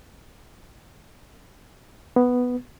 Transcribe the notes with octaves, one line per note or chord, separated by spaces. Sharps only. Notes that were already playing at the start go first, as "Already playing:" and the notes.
B3